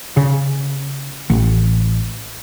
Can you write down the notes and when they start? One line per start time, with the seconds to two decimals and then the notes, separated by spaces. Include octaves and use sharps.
0.17 C#3
1.30 A1